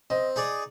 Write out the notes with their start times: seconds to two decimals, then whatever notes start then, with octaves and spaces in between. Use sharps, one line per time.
0.10 C4 D#5
0.36 D#4 G#4 D5